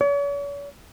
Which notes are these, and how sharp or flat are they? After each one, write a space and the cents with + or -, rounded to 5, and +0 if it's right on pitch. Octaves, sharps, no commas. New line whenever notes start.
C#5 +45